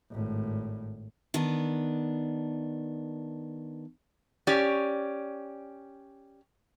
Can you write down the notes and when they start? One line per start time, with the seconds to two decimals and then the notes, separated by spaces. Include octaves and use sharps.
0.10 G#1 A2
1.34 D#3 B3 D4
4.47 C#4 G4 D5